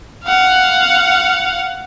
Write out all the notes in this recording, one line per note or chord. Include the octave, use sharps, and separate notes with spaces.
F5 F#5